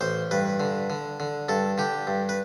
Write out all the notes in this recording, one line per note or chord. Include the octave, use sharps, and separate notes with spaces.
A1 C5
G2 B4
D3
D3
D3
G2 A4
D3 G4
G2
B4